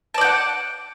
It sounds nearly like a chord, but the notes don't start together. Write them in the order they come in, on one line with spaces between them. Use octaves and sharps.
A5 D5 G5 F#5